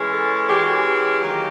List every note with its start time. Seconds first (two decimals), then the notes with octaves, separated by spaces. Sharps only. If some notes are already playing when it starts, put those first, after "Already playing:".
Already playing: E3 G#3 C#4
0.13 A4
0.49 E3 G#3 C#4 G4
0.61 F#4
0.74 G4
1.20 D#3 F#3 A#3 D#4